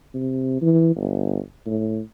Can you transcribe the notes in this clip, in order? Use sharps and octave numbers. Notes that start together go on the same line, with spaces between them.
C3
E3
G1
A2